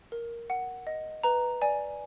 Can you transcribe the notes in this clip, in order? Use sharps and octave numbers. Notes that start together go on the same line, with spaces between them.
A#4
F#5
D#5
B4 A#5
D5 G#5